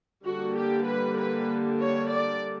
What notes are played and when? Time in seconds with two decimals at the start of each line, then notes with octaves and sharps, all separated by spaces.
0.24 D3 G3 A#3 F#4
0.56 G4
0.87 B4
1.18 B4
1.79 C#5
2.11 D5